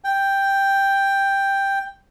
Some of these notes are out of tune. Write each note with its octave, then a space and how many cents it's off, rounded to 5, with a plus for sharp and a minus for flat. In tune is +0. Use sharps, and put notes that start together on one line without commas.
G5 +5